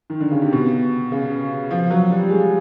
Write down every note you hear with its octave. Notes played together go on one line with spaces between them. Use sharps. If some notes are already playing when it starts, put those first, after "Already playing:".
D#3
D3
C#3
C3
B2
C#3
F3
F#3
G3
G#3